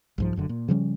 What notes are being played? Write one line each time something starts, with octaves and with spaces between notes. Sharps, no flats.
C2 G#2 F3
F1 F#2 D3
A#2
C#3 F3 G3 C#4